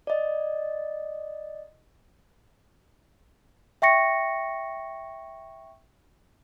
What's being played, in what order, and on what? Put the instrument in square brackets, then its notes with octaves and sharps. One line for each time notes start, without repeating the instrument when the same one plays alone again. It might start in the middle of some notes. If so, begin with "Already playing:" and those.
[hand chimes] D5 D#5
[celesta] E5 G5 C#6 A#6 C#7